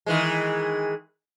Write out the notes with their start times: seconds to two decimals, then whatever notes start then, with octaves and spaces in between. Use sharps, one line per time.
0.06 D#3 E3 G#3